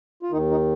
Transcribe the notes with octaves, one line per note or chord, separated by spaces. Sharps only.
F4
D#2 D#3 D#4
D#4